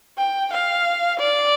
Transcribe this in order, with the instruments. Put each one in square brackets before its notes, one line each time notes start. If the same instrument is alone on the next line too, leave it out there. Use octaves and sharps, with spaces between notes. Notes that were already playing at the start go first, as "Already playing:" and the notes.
[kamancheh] G5
F5
D5